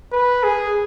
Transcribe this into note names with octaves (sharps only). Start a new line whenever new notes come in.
B4
G#4